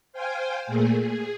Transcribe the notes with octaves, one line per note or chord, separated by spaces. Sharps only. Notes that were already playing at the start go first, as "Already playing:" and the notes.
C5 F5 G5 G#5
A#2 A3 A#3 G#4
G#4